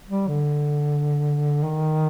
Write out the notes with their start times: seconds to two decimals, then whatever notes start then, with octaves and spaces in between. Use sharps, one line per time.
0.09 G3
0.28 D3
1.63 D#3